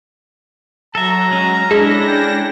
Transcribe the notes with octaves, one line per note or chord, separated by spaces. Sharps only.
F#3 A4 E5 A#5
G#3 C#4
G#3 C#4 D4 E4 A4 A#6
G5